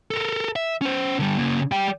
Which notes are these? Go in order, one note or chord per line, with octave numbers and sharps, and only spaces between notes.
A4 A#4
E5
C#4 C5
D3 G3
C#3 A#3
G3 G5